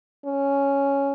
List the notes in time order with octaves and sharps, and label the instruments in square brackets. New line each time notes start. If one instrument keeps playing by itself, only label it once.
[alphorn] C#4